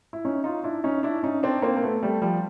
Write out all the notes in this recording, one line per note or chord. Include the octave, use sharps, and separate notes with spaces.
E4
C#4 D#4
D#4 F4
D4 E4
C#4 D#4
D4 E4
C#4 D#4
C4 D4
A#3 C4
A#3
A3 B3
G3 A3
F3 G3